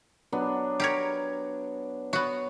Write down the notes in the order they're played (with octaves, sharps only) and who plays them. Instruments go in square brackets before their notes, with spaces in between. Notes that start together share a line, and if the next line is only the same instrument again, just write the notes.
[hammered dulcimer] F#3 B3 D4
[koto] G4 A#4 C#5
[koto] B3 F#4 [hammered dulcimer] C#5